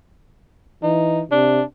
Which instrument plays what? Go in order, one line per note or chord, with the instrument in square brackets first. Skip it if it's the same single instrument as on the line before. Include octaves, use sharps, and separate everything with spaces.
[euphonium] E3 [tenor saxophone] D#4
[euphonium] C3 [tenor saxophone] D4